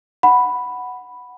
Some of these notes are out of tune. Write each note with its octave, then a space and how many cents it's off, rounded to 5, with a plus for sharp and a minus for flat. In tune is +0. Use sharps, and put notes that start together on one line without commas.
F#5 +0 B5 +0